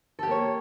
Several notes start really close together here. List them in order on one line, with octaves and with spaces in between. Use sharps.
A4 G4 A#3 C#5